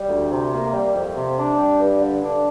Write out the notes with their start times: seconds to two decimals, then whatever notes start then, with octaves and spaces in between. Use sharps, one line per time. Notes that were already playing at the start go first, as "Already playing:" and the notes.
Already playing: G3
0.09 D2
0.31 C3
0.52 A#3
0.73 G3
0.94 F2
1.16 C3
1.37 D4
1.57 G3
1.80 G2
2.00 D3
2.22 D4